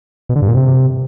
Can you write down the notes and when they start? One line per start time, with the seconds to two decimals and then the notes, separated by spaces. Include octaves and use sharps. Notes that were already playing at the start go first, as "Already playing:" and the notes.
0.29 B2
0.36 D3
0.42 G2
0.48 A#2
0.55 C3